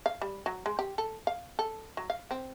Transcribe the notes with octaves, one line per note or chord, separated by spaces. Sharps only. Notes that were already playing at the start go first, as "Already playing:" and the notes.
F5
G3
F#3
G#3
G4
A4
F5
A4
F#3
F5
C4